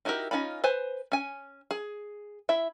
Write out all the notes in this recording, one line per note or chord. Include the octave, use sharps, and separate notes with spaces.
D#4 E4 F#4 G4 A#4
C#4 D#4 F4 B5
B4 C5 G#5
C#4 G#5
G#4
E4 E5